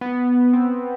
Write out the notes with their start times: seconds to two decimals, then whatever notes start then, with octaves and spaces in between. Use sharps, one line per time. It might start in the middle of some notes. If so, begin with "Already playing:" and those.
0.01 B3
0.53 C4